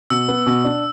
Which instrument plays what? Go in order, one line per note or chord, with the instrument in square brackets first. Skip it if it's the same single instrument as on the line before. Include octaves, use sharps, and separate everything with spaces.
[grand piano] B2 [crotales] E6
[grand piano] B3
B2
D4